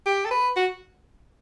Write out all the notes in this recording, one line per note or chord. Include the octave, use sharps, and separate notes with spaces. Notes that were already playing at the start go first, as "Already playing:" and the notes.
G4
A4
B4
F#4